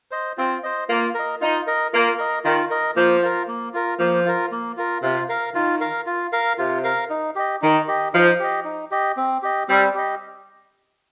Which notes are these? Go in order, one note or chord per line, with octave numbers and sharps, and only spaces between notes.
C5 D#5
C4 F4
C5 D#5
A#3 F4
A#4 D#5
D#4 F4
A#4 D#5
A#3 F4
A#4 D#5
D#3 F4
A#4 D#5
F3 A#3
F4 A#4
A#3
F4 A#4
F3 A#3
F4 A#4
A#3
F4 A#4
C3 F4
A#4 F5
D#3 F4
A#4 F5
F4
A#4 F5
C3 F4
A#4 F5
D#4
G4 D#5
D#3 D#4
G4 D#5
F3 D#4
G4 D#5
D#4
G4 D#5
C4
G4 D#5
G3 C4
G4 D#5